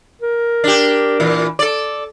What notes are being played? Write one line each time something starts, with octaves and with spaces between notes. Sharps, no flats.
A#4
D4 G4
A#2 E3
A4 D5